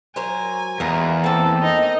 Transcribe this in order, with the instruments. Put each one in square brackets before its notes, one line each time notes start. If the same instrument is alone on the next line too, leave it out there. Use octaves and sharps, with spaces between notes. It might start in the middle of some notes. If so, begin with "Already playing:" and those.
[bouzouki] F#3 A#4 C5 [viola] G#5
[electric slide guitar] E2 [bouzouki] G#3 A#3 A#4
[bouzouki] A#3 C4 [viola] A4
[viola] D#4 D#5